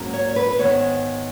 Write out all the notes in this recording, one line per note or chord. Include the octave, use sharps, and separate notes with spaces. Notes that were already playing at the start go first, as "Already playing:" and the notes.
Already playing: G#2 F#3 A#3 C#4
C#5
C#5
B4
B4
G#2 D#3 G#3 B3 C#5